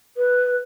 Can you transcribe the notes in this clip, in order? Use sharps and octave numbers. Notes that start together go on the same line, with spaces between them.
B4